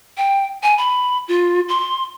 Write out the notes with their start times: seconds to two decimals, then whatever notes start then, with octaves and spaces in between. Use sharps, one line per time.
0.17 G5
0.63 G#5
0.78 B5
1.28 F4
1.69 C6